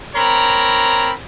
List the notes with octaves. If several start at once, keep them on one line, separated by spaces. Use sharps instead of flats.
C4 A#4 C#5 A#5 B5